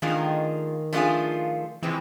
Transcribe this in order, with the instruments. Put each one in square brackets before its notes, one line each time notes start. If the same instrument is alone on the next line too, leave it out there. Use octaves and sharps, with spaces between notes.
[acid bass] D#3 [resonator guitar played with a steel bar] F3 A3 D4 F4 G#4
[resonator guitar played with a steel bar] F3 A3 D4 F4 G#4
[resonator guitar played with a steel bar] C3 F3 G#3 C4 [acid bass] E3